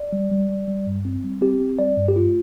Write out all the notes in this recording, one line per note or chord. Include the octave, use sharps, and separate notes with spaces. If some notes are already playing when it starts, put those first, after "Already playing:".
Already playing: D5
G3
G3
G3
G3
G2
C4
G3
C4 G4
C4
G3 D5
G2
G4
A3 F4